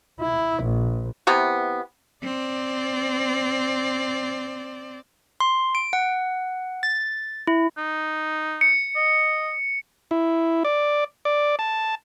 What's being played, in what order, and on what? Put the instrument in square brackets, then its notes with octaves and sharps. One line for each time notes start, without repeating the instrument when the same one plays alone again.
[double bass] E4
A#1
[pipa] C3 E3 B3
[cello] C4 D5
[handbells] C6
D7
F#5
A6
E4
[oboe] D#4
[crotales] C#7
[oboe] D#5
[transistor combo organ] E4
D5
D5
A5